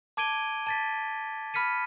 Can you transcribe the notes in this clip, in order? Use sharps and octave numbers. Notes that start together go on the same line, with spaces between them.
A5 D6 G#6 D7 D#7 G7
A5 A6 B6
B5 F6 B6 C#7 D#7